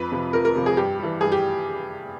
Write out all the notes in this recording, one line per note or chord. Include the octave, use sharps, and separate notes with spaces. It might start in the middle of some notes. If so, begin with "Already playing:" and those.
Already playing: F2 B4
C3 F3
F2 A#4
A#4
C3 F3
G#4
G2 G4
E3 G3
G2 G#4
G4